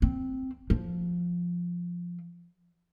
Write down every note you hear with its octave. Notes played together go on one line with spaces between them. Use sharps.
C4
F3